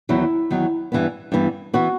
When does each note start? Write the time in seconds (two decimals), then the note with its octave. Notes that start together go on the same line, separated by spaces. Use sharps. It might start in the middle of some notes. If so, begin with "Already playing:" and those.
0.09 E2 D#3 F#3 E4
0.51 E2 D#3 F#3
0.92 G2 E3 G3 B3
1.32 G2 E3 G3 B3
1.73 E3 B3 F#4